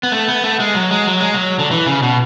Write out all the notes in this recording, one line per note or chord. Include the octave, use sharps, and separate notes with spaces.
B3
A3
B3
A3
G#3
F#3
G#3
F#3
G#3
F#3
D3
E3
C#3
B2